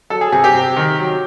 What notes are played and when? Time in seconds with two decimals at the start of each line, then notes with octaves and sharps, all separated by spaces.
0.10 F#3 A4
0.21 G#4
0.32 C3 G#4
0.44 G4
0.55 C3
0.76 D#3
0.99 F#3